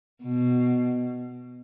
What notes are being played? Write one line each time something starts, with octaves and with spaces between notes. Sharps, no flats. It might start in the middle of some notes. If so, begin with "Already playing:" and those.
B2